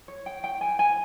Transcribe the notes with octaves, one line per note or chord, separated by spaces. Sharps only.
C#5
G5
G5
G#5
G#5